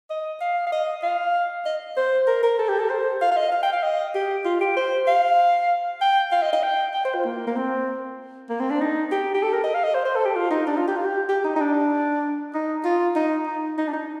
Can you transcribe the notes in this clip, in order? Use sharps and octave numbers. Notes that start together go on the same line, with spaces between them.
D#5
F5
F5
D#5
F5
D#5
C5
A#4
A#4
A4
G4
A4
C5
F5
F5
D#5
F5
G5
F5
D#5
G4
F4
G4
C5
F5
G5
F5
D#5
D#5
G5
G5
C5
F4
A#3
A#3
C4
A#3
C4
D4
D#4
G4
G4
A4
A#4
D#5
F5
D#5
C5
C5
A4
G4
F4
D#4
D4
F4
G4
F4
G4
G4
D#4
D#4
D4
D#4
F4
D#4
D#4
D#4
D4
D#4